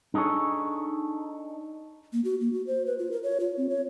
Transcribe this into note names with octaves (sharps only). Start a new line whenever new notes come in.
D4 D#4 G#4 A4 C#5
A#3
F#4
A#3
F#4
C5
B4
F4
A#4
C#5
F4
C4
C#5